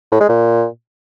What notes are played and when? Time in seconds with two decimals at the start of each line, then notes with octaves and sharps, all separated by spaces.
0.12 A2
0.20 G#3
0.29 A#2